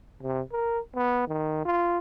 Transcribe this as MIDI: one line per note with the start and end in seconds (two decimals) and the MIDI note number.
0.22 0.41 48
0.52 0.79 70
0.95 1.25 59
1.28 1.65 51
1.65 1.99 65